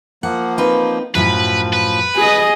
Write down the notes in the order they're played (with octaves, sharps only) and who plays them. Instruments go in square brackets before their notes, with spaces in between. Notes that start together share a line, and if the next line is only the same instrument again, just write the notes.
[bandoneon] F3 A#3 [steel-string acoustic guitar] F#5
[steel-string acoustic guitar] C4 D#4 B4
[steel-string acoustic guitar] F#2 A2 F#3 [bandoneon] F3 [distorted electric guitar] B4
[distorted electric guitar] B4
[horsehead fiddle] G#4 D#5